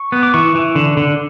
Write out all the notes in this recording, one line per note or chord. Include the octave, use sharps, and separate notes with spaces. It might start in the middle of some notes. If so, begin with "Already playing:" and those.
Already playing: C#6
B3
D6
E3 C#6
E3
D3
D3